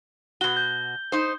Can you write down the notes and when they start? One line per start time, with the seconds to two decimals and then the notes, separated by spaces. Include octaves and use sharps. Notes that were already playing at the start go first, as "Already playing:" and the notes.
0.41 B2 F#4 G7
0.57 G6
1.12 D#4 C5